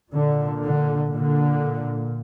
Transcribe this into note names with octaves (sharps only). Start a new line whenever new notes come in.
A#2 D3
D3
A#2 D3